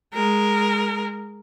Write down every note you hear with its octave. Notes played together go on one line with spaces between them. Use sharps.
G#3 A#4